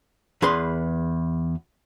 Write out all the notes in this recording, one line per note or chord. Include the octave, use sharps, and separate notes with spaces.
E2 G#4 B4 B5 C6